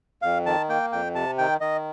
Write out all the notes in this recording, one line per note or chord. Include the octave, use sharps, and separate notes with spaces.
F2 F5
D#3 A5
A#3 G5
F2 G5
C3 A5
D#3 G5
D#3 D#5